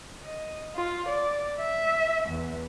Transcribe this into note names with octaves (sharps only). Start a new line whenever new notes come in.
D#5
F4
D5
E5
E2